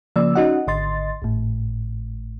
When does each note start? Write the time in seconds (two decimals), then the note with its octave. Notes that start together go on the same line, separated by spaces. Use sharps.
0.16 C#3 F3 A#3 D5 E6
0.35 C#4 D#4 F#4 D#5 F#5
0.67 G#1 D3 D#5 C6 A6
1.22 G#1 A2